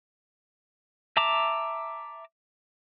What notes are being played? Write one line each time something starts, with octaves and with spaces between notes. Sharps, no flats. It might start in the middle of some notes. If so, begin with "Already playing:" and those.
E5 A5 A#5 D6